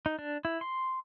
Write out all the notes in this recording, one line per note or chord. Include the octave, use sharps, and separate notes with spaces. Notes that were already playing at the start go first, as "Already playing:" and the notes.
D#4
D4
E4
C6